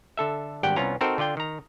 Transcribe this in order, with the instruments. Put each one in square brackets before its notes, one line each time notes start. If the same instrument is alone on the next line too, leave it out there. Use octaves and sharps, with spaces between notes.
[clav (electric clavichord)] D3 A4 E5
G#1 G2 G4 D5 F#5 G5
C2 B3 C#4 F4 A#5
C4 D#4 F#4 A4 A#4 C5
D3 F4 D5 G5
D#3 A#5